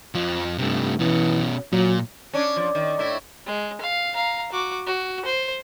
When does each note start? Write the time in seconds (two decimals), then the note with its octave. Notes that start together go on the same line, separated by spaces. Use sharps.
0.15 F2 F3
0.58 G2 C3 A3
1.00 B2 E3 C#4
1.72 A#2 F#3
2.33 C#4 D4 D5 D6
2.56 F3
2.75 D#3
2.99 A2 E4
3.46 G#3
3.81 F5
4.15 F5 A#5
4.52 F#4 D6
4.87 F#4
5.25 C5